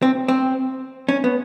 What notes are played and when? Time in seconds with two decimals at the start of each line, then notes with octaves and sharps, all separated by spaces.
0.02 C4
0.28 C4
1.09 C#4
1.24 B3